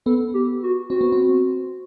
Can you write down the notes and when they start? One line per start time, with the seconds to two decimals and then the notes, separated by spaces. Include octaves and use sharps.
0.06 B3 A4
0.34 G4
0.63 F#4
0.90 C4 F#4
1.01 B3
1.12 C4